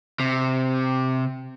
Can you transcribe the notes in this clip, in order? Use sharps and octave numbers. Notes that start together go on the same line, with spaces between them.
C3